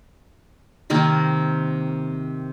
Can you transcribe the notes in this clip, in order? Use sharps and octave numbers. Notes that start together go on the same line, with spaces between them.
C3 D#3 A#3 C4